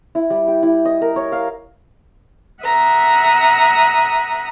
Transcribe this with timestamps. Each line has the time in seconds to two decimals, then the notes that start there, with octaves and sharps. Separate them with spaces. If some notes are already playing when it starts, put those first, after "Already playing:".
0.15 E4
0.30 G3
0.48 G4
0.63 E4
0.85 D#5
1.01 A#4
1.16 C#5
1.32 F5
2.63 E5 F#5 A#5 D#6